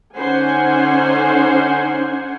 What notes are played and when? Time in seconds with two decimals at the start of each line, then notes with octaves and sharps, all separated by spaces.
0.15 D3 C#4 D#4 C5 F#5 G#5